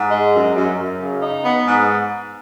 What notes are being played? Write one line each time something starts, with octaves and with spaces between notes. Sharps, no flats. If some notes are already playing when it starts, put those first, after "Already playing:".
Already playing: G#2
G#3
F#2
F#2
F#2
C#3
D#4
B3
G#2